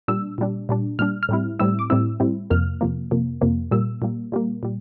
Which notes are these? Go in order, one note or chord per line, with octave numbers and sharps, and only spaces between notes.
A#2 G3 D4 E6
A#2 G3 D4
A#2 G3 D4
A#2 G3 D4 F6
F6
A2 G3 C4 E4
A2 G3 C4 E4 E6
D6
A2 G3 C4 E4 E6
A2 G3 C4 E4
F2 C3 F3 A#3 F6
F2 C3 F3 A#3
F2 C3 F3 A#3
F2 C3 F3 A#3
A#2 G3 A#3 E6
A#2 G3 A#3
A#2 G3 A#3
A#2 G3